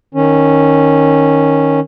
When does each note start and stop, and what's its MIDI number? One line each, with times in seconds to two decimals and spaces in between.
0.14 1.80 51
0.14 1.80 61